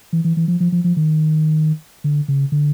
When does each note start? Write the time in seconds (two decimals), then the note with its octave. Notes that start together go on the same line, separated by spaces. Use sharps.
0.13 E3
0.25 E3
0.37 E3
0.48 F3
0.60 F3
0.72 F3
0.84 F3
0.97 D#3
2.04 D3
2.28 C#3
2.52 D3